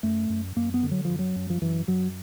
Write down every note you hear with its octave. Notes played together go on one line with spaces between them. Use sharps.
F#2 A3
F#2
F#2 A#3
B3
D3
F#3
F#2 F3
F#3
F#2
F3
F#2 E3
F#2 F#3